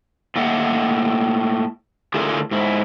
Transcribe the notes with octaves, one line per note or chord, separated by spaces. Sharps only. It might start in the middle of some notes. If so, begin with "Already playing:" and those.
A2 A#3 D#5 E5 F#5
D3 A3 E4 F4 G#4 A#4
G#2 E4